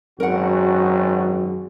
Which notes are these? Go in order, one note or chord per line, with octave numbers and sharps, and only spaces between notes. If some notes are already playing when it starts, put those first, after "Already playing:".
G#1 F#2 F#3 F#4 A#4 F#5